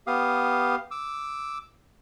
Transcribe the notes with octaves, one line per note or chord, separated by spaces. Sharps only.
B3 G4 F5 D#6
D6 E6